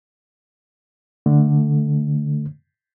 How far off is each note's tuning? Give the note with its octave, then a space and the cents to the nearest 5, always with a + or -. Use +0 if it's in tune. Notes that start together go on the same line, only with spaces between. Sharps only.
D3 +0 A3 +0